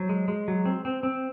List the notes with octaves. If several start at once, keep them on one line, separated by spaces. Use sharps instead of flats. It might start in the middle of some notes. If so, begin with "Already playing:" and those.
Already playing: F#3 C5
G#3
G#3
F#3
C4
C4
C4